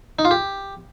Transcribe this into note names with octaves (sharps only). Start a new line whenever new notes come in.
D#4
F4
G4